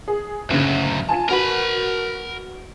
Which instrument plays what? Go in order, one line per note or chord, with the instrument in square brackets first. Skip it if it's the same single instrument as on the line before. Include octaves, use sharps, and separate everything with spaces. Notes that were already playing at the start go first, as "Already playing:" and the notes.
[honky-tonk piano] G#4
[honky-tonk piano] F#1 C#3 [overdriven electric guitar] D2 F#3
[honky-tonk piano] F4 G#5 A5
[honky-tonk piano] F#4 B4 [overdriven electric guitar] A#4 B5